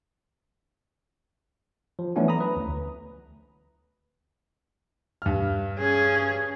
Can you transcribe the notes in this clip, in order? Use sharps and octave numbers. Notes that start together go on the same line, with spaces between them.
F3
E3 F#3 A3 B3 C#4 D4
A#5 B5 D#6
B4
D2
G2 F6
C#4 G#4